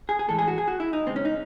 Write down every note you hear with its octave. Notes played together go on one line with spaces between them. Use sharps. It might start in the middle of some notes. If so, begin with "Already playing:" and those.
G#4
G#4
A2 E3 G#3 A4
G#4
F#4
G#4
F#4
E4
D#4
C#3 G#3 C4
C#4
D#4